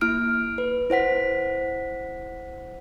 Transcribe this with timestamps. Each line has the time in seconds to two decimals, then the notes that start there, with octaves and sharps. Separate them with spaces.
0.01 A#3 E4 F6 D7
0.58 B4
0.90 E4 C5 F#5 B6